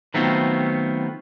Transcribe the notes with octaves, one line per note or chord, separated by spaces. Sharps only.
D#3 F#3 A3 B3 C4 F4